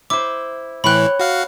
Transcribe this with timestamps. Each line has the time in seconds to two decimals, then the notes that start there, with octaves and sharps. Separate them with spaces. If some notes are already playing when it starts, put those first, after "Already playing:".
0.10 E4 C5 D6
0.84 A2 E3 C#5 G5 B5 F#6
1.20 F#4 F5 F#5